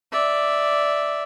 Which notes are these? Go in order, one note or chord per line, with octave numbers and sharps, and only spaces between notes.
D5 E5